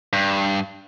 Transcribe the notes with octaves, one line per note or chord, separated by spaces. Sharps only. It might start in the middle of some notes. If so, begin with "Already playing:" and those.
G2